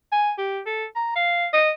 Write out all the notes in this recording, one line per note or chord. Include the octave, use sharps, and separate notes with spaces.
G#5
G4
A4
A#5
F5
D#5